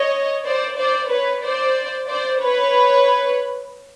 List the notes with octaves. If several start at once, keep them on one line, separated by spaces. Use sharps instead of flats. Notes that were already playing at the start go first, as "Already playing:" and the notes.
Already playing: C#5 D#5
C5 D5
C5 D5
B4 C#5
C5 D5
C5 D5
B4 C#5